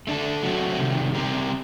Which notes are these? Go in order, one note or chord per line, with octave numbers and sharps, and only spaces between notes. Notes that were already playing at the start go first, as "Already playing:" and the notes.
A3 D4 A4
F#3 A3 C4 F#4
C3 D#3 G3
G3 C4 G4 A#4